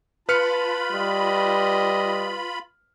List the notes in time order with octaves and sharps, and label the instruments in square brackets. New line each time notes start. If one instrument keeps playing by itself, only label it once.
[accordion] F4 B5 [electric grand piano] B4 F6 C#7 [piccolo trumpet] A5
[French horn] G3 [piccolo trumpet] D#5